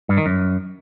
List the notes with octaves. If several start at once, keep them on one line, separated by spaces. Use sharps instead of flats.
G2
D#3
F#2